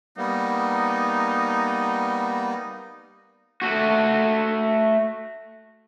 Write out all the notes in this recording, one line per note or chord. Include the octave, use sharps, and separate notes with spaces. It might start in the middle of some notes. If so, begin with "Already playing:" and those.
G3 A#3 B3 D#4
A3 F#4